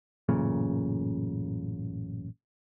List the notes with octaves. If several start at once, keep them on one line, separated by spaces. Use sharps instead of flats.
A1 F#2 A#2 C#3